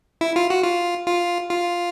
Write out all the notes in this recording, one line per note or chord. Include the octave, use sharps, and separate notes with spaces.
E4
F4
F#4
F4
F4
F4